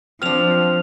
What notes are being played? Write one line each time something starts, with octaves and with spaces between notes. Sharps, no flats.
F3 C4 D4 F6 F7